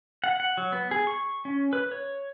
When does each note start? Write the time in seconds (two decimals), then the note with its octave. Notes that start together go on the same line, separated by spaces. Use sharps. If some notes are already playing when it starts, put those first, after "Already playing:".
0.24 F#5
0.40 F#5
0.57 F#3
0.72 B3
0.91 G#4
1.07 C#6
1.45 C#4
1.73 B4
1.91 C#5